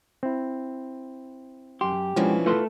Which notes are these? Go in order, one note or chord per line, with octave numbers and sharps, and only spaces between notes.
C4 E4
F#2 G4 C6
B2 E3 F3 G#3 C#4 D4 F#4
A3 F4 A4 B4 C6